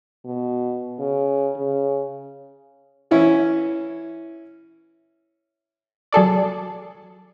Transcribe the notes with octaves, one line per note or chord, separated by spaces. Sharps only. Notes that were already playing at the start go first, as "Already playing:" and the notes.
B2
C#3
C#3
E3 C#4 E4
F#3 G#4 A4 D5